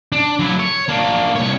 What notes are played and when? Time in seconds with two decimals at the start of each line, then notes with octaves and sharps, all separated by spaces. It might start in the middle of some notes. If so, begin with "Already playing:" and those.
0.12 D4
0.40 F#3 E4
0.59 C#5
0.89 A#3 D4
1.36 C2 C#5